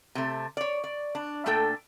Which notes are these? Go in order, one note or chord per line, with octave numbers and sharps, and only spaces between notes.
C3 A3
C#5 D5
D5
D4
A#2 A3 D4 A4 G5